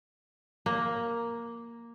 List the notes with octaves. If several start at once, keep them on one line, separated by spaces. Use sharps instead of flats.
A#3